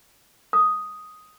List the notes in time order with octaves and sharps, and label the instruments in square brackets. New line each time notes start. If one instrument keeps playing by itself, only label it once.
[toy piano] D#6